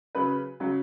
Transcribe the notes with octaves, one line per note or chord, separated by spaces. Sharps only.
C#3 F#3 B4
C#3 F#3